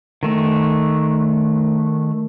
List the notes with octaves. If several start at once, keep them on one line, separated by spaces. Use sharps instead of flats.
D#3 A3